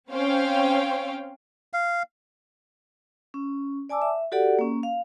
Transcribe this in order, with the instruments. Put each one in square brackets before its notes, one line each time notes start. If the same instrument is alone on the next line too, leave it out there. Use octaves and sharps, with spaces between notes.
[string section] C4 C#4 C5 C#5 F5 G5
[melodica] F5
[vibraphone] C#4
D5 G#5 A5 D6 E6
E5
F#4 G4 A4 D5 F#5
A#3 C#4
F5